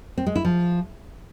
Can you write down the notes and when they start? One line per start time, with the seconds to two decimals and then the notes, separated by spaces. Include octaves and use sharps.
0.17 C4
0.27 G#3
0.36 E4
0.45 F3